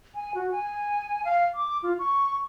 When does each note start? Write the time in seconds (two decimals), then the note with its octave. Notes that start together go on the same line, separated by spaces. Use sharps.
0.15 G#5
0.35 F#4
0.51 G#5
1.25 F5
1.55 D6
1.83 F4
1.99 C#6